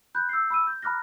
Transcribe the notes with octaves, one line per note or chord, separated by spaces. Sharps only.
B5 F#6 G6
E6 G6 C7
B5 E6 D#7
G6
A#5 B5 D6 F6 F#6 A#6